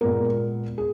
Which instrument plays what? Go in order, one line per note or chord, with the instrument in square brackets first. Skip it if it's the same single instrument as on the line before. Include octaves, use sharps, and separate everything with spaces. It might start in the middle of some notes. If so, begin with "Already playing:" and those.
[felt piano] A#2 G#3 B3 A#4
G#4